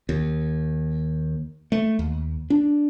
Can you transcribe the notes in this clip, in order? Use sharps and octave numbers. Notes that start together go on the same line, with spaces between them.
D#2
A3
D#2
D4